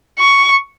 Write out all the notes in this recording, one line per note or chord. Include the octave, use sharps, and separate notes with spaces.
C#6